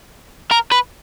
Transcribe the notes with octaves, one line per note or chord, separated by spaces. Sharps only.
A#4
B4